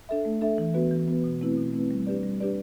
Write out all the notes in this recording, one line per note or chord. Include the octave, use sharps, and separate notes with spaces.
D4 A4 E5
A3
D4 A4 E5
E3
B3 F#4 B4
E3
B3 F#4 B4
B2
A3 C4 E4 B4
B2
A3 C4 E4 B4
G3
D4 G4 B4 D5
G3
D4 G4 B4 D5